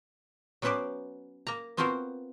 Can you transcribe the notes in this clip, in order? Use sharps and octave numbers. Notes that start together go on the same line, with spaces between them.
F#3 B3 C#4 B4 C5 D5
A#3 A#5
B3 C4 F4 F#4 A#4 C5